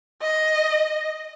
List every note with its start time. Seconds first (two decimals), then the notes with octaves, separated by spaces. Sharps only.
0.22 D#5